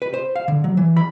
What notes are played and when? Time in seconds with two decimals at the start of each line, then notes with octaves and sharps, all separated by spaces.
0.02 B4
0.14 C5
0.36 F5
0.48 D3
0.64 F#3
0.77 E3
0.97 B5